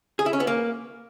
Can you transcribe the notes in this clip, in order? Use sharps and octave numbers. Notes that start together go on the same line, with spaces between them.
G#4
E4
C#4
B3
A#3